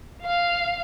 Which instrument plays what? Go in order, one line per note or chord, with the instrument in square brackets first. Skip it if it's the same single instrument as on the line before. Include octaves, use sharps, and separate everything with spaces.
[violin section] F5